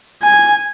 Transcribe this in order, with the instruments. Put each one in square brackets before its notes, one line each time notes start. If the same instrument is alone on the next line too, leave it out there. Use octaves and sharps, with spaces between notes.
[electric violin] G#5